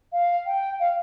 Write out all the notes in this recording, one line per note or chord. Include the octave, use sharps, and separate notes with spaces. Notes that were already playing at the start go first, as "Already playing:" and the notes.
F5
G5
F5